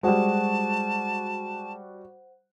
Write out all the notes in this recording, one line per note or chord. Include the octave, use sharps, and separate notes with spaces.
G3 G#3 F#4 C5 F#5 A5